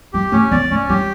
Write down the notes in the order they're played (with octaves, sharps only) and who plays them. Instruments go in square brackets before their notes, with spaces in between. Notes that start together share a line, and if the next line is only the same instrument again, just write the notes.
[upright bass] G3 [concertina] G4
[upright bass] A3 [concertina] C#4
[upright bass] B3 [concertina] D5
[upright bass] A3 [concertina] C#4
[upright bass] G3 [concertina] G4